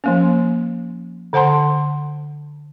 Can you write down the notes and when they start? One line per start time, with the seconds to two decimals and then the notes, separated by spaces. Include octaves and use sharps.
0.04 F3 A#3 C#4
1.33 D3 C5 F#5 A5 C6